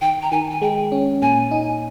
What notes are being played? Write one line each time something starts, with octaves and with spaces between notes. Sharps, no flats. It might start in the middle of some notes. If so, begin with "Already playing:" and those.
D#3 G5
A#5
D#3 G#5
G#5
G#3 G5
C#4
A#2 G#5
D#4